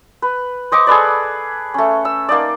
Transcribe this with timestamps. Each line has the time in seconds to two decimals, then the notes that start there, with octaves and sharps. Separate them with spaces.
0.22 B4
0.72 C5 D#5 C#6 D6
0.87 G#4 A4 B4 D5
1.74 A3 C#4
2.05 E6
2.29 A#3 D#4 D5